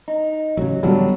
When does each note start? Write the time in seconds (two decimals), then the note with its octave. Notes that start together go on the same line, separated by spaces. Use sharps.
0.08 D#4
0.57 A1 C#3 F#3
0.83 A1 D3 F#3 G3 B3 D4